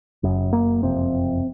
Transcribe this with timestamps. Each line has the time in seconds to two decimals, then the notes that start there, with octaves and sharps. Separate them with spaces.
0.23 F#1 F#2 C#3
0.53 A#3
0.82 F#1 F2 C3 C4